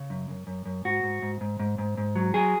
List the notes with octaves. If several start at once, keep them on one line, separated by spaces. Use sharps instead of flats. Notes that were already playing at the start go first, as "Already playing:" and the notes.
Already playing: C#3
F#2
F#2
F#2
F#2
G#2 F#4
G#2
G#2
G#2
G#2
G#2
G#2
F#3
F#3 G#4